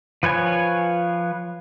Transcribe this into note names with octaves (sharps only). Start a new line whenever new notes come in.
F3 B4 C#5 G#5